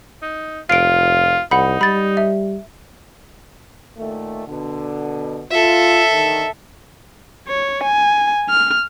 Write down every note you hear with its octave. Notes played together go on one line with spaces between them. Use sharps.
D#4
F1 F4 C7 D7
C2 D#4 F#5 B5
G3 B5 A6
E5
A#2 D#3 A3
B2 D3
F4 A4 E5
D#2 D3 D#3
C#5
G#5
F6